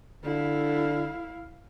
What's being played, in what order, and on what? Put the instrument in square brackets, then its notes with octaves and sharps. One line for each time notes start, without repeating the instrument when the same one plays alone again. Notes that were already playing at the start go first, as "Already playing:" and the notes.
[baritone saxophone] D3 [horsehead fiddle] E4 F5